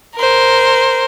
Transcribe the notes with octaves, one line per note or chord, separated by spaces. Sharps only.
A#4 C5